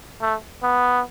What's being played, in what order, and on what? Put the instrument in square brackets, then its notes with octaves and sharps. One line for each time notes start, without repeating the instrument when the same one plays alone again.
[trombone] A3
B3